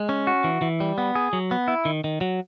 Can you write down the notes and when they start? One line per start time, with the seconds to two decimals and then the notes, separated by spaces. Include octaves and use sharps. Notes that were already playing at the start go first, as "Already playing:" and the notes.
Already playing: G#3
0.09 C#4
0.27 F#4
0.44 E3
0.62 E3
0.80 G3
0.98 B3
1.15 G#4
1.33 F#3
1.51 B3
1.68 E4
1.85 D#3
2.04 D#3
2.21 F#3